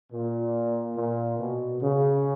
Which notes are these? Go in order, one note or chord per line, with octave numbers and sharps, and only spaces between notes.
A#2
A#2
B2
C#3